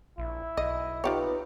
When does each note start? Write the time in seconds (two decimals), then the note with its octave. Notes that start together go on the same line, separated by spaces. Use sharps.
0.18 A#1 E4
0.57 B1 D#5
1.04 D#4 F4 G4 B4 C#5